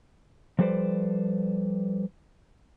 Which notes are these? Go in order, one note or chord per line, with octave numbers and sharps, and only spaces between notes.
F3 G3 A4 B4 C5 D5